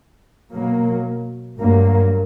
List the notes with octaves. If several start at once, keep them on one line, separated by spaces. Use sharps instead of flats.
B2 F#3 A#3
G2 F#3 A#3